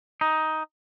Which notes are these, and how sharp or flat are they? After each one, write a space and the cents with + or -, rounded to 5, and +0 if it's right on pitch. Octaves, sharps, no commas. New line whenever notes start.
D#4 +10